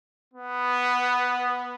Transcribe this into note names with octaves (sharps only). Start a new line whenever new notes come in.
B3